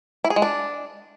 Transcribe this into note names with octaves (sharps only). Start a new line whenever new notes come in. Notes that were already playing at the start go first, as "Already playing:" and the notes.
E4
G#4
G#3
D4